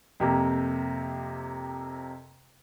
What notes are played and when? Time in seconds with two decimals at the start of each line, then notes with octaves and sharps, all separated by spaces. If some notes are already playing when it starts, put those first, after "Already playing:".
0.20 F2 C3 A#3